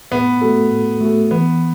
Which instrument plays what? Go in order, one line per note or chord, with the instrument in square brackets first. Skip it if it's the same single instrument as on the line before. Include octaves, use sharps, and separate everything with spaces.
[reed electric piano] A2 [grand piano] B3
[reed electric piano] A3 F#4 A4
A2
A3 F#4 A4
[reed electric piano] E3 [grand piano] B3